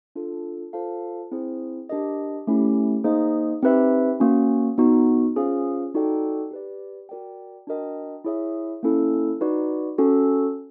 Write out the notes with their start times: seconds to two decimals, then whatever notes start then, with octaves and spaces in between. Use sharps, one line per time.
0.16 D4 F4 A4
0.73 F4 A4 C5 F5 A5
1.31 C4 E4 G#4 C5
1.89 D4 G4 A#4 D#5
2.47 A3 C#4 E4 G4
3.04 A#3 D#4 G#4 C5 D#5
3.62 C4 D#4 G4 B4 E5
4.20 A#3 C#4 F#4
4.78 B3 D#4 F#4
5.36 C#4 F4 G#4 C5 F5
5.94 D#4 F#4 A4 D5 G5
6.51 G4 B4 D5
7.09 F#4 A#4 D5 G5
7.67 D4 F#4 A#4 D#5 G5
8.24 E4 G#4 C#5 E5
8.83 A#3 C#4 E4 A4
9.41 D#4 F#4 B4 D5
9.98 C#4 F#4 A4